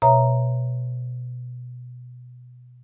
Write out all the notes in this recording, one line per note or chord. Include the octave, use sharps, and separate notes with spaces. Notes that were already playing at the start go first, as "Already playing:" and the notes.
B2 C#5 E5 A#5